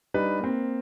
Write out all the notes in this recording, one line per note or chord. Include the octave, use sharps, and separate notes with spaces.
G3 D4 D#4 B4
A#3 C4